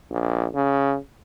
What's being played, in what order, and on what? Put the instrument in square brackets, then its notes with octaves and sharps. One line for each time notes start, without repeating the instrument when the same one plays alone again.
[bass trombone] A#1
C#3